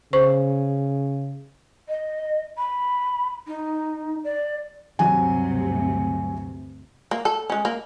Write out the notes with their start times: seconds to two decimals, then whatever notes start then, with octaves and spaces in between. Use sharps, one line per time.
0.13 C#3 C5 C#6
1.89 D#5
2.58 B5
3.47 D#4
4.24 D5
4.99 D2 G2 C3 F#3 G#5
7.11 A#3
7.25 A4
7.50 G#3 C#4
7.65 A#3